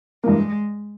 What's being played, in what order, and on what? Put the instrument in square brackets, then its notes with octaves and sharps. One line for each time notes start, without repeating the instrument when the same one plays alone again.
[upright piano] G2 E3 A#3 [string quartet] G#3